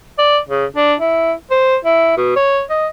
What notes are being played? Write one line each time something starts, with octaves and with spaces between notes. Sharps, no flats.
D5
C#3
D4
E4
C5
E4
B2
C#5
D#5